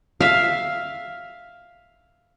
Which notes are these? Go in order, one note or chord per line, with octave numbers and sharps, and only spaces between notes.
E5 F5